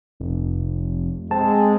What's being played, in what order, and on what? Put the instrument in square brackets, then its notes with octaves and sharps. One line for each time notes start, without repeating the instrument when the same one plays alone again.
[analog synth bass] F1
[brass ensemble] G#3 [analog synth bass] C4 [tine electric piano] A5